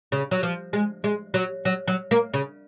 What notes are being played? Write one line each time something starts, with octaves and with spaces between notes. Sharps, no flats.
C#3
F#3
F3
G#3
G#3
F#3
F#3
F#3
A#3
C#3